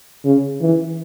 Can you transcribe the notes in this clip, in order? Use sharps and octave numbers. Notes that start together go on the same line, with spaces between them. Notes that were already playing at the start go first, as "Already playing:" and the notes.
C#3
E3